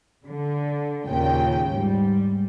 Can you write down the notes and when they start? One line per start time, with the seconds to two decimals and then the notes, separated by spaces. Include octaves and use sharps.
0.24 D3
1.08 D#2 A#2 C#3 G5
1.71 G#2 G3